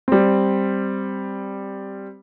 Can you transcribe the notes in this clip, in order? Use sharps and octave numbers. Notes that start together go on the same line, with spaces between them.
G3 C4